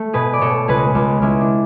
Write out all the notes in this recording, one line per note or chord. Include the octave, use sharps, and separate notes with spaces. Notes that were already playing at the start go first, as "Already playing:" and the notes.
Already playing: A3
B2 G#4 B4
D5
B2 A4 C#5
C#2 G#4 B4
C#2
C#2 C#4 E4
D4